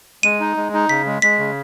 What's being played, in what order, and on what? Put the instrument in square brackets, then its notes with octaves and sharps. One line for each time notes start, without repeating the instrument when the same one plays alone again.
[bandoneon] G#3 [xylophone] D#7
[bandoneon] D#4
G#3
D#4
[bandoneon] C#3 [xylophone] B6
[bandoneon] G#3
[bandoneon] G#3 [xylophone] B6
[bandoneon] C#3